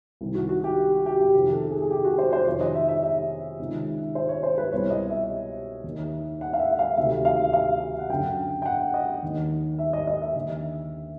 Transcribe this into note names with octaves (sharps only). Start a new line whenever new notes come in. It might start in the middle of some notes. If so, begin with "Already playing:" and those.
C2 C3 D#3
F#4
F#4
G4
F#4
G4
G4
F2 C3 D#3
A4
G#4
G#4
G4
F#4
C5
C5
F2 C3 D#3 C#5
D#5
E5
E5
E5
C#2 C3 D#3
C5
C#5
C5
B4
C2 B2 C#5
D#5
E5
D#2 D#3
F#5
F5
E5
F5
D2 C3 D#3 E5
F5
F5
F#5
F#2 D3 G5
G5
F#5
D#5
D#2 D#3
E5
D#5
D#5
E5
D#2 D3